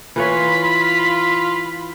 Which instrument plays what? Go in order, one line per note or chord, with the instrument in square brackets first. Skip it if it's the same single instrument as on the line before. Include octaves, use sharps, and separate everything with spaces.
[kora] E3 B4 C#5 [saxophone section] F4 [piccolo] B5